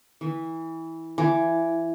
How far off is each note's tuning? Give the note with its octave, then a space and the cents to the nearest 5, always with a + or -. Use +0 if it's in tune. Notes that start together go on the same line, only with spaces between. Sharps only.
E3 -15
E3 +15